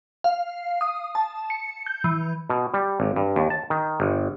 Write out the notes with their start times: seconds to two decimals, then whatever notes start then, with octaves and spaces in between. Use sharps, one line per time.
0.24 F5
0.81 D#6
1.15 A5
1.50 C#7
1.86 G6
2.04 E3
2.50 B2
2.74 G3
3.00 G#1
3.16 G2
3.36 D#2
3.50 A5
3.70 D#3
4.00 G1